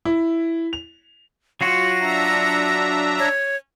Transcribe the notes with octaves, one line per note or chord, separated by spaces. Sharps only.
E4
F7
F#3 F4 F#4 A#6
D4 E5 A#5
C#5